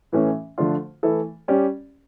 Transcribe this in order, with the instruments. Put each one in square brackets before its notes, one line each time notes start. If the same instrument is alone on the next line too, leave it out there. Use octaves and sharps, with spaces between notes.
[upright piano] A2 E3 A3 C#4
D3 F3 A3 D4 F4
E3 A3 E4 A4
G3 C#4 G4 D5